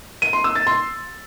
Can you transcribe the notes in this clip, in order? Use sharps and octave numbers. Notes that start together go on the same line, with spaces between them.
D#7
C6
E6
A6
C6